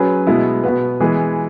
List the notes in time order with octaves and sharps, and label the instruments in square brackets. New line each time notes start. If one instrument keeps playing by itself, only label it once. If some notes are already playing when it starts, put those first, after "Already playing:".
Already playing: [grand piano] F#3 C#4 G#4 B4
B2 G#3 B3 E4
B2 B3 F#4 B4
E3 G#3 B3 G#4